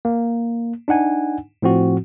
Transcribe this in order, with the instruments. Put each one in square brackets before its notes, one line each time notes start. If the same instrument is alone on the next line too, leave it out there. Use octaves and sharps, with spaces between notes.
[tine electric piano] A#3
D4 D#4 F#5 G#5
A2 F3 C4 F#4